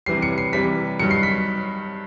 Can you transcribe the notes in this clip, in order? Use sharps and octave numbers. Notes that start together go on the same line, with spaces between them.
C3 E3 G3 C7
C#7
C7
C3 E3 G3 B6
G2 D#3 F#3 C#7
C7
B6